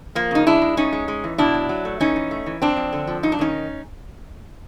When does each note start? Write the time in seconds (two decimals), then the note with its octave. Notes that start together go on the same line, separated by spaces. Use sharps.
0.15 F3 A#3
0.31 C#3 D#4
0.46 G#3 D4 E4
0.62 G#3
0.77 A2 C#4 D#4
0.93 G#3
1.08 G#3
1.24 E3
1.38 B2 D4 E4
1.54 F#3
1.69 F#3
1.85 A3
2.00 E3 C#4 D#4
2.16 E3
2.31 A3
2.46 E3
2.62 F2 C4 D4
2.76 F2
2.93 D3
3.07 F3
3.23 G2 D#4
3.32 D4
3.39 D#3 C#4 D#4